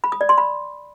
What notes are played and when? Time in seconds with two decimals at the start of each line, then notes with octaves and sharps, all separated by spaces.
0.04 B5
0.12 D#6
0.21 D5
0.29 C6
0.38 B5